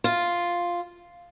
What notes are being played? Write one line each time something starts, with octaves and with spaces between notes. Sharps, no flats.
F4